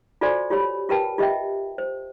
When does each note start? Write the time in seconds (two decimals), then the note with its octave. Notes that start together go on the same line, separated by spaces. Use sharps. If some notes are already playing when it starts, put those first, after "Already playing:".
0.21 F4 F#4 A4 C5 D5 G#5
0.50 F4 G4 C#5 B5
0.89 F4 G4 A#4 B4 G5 A5
1.18 F4 G4 D#5 E5 G5
1.78 C5